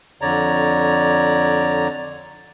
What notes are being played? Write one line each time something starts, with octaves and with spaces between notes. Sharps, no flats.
F2 D3 C#5 D5 A#5